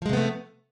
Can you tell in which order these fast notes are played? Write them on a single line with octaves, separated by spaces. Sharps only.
F3 G#3 C3 B3 A3